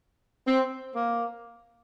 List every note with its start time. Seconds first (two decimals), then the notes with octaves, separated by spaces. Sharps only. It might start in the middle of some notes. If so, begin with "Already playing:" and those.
0.46 C4
0.95 A#3